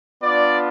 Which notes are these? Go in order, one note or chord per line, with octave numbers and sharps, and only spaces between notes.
B3 D4 F4 D5